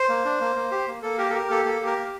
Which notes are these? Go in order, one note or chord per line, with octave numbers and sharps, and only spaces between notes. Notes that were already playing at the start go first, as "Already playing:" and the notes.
Already playing: C5
A#3
D4
A#3
A#3
G4
A#3
A#3 A4
G4 A#4
A4
G4 A#4
A#3 A4
A#3 A4
G4
A#4
A#3